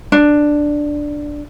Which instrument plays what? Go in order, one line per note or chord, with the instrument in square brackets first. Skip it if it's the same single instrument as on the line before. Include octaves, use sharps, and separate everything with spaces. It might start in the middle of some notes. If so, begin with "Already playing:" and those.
[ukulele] D4